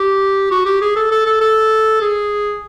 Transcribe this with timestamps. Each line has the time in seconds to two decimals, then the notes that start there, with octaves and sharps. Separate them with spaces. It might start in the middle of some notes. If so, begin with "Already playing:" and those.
Already playing: G4
0.51 F#4
0.66 G4
0.81 G#4
0.96 A4
1.11 A4
1.26 A4
1.41 A4
2.01 G#4